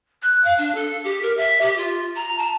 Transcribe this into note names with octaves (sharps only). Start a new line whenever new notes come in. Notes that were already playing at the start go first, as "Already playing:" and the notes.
F#6
F5
D4
A4
G4
A#4
E5
G4
F4
A#5
A5